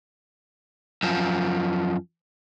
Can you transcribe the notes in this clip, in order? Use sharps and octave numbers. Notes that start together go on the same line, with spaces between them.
F#2 F3